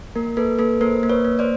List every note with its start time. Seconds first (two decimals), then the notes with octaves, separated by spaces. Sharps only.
0.16 A#3 A#4
0.37 A#3 A4 B4
0.59 A#3 A4 B4
0.81 A#3 A#4 C5
1.03 A#3
1.09 B4 C#5
1.25 A#3
1.39 C5 D5